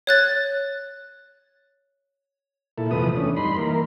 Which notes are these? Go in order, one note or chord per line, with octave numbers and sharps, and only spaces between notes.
C#5 F#6 A6
A#2 E4 A4
E2 C3 F3 A3 B4 D#6
E2 A3 C#4 D4
G2 D#4 B5 C6
E3 A#3 A#4